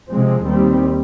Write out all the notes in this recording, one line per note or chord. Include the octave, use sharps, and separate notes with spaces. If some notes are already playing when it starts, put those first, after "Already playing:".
C3 F3 G#3 C4
D#2 D#3 G3 C4